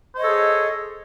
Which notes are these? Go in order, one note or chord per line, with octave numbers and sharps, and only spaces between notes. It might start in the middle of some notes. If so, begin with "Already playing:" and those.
G#4 A4 C5 C#5 D#5